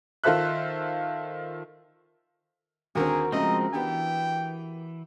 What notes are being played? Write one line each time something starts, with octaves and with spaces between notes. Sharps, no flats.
D#3 F4 A4 C5 E5 F#6
D#2 D3 C4 F#4 G#4 A#4
C#3 F3 G#3 A3 C4 A#4 D#5
E3 B3 D4 G4 G5